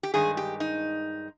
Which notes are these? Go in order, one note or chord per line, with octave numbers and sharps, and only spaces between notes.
G4
G2 D#3 G#3 G#4
G4
D#4